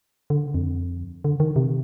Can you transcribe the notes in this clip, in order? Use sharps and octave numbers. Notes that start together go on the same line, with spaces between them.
D3
F2
D3
D#3
C3